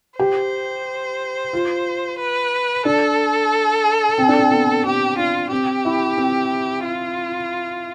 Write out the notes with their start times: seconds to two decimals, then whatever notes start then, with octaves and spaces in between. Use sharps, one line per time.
0.19 G4 C5
1.53 F4
2.19 B4
2.85 D4 A4
4.18 C4
4.28 D4
4.39 C4
4.51 B3
4.86 C4 G4
5.18 D4 F4
5.51 C4 G4
5.85 E4
6.17 C4
6.85 F4